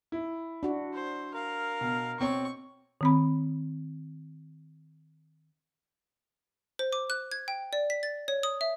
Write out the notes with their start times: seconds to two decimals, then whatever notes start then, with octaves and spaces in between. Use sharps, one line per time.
0.12 E4
0.63 D4 F#4
0.93 C5
1.34 A#4 F5
1.81 B2
2.20 B2 C4 C#5 C#6
3.01 D#3 C4 B5
6.79 C5
6.93 D6
7.10 F#6
7.32 G#6
7.48 G5
7.73 D5
7.90 B6
8.03 A6
8.28 C#5
8.43 D#6
8.61 E5